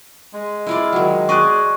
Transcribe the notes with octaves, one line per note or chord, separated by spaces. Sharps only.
G#3
E4 F4 D5
D#3 F#3
G#4 D5 D#5 C#6 F#6